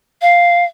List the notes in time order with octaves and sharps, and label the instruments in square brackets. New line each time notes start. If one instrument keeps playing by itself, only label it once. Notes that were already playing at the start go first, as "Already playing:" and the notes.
[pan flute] F5